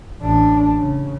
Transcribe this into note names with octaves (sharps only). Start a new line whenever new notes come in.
A1 D4
C#3